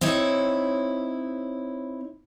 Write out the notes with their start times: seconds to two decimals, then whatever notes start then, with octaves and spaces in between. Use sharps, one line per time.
0.01 C4 D#4 E4 C#5